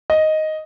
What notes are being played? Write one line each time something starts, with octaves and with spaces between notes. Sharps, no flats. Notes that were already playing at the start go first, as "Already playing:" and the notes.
D#5